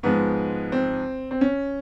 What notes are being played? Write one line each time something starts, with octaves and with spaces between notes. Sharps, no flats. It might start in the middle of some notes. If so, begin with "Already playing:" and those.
G#2 F3 G#3 B3
C4
C4
C#4